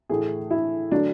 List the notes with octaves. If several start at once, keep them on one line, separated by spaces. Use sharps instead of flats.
A2 E3 A3 G#4
E4
D3 F#3 A3 D4